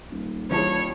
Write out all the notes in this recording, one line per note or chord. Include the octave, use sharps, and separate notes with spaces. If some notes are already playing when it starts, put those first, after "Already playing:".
D#1
E3 F3 G3 G#4 C#5 A5